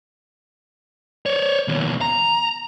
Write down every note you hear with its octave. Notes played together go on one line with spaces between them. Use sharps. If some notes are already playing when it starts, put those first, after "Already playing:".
C#5 D5
D#2 B2
A#5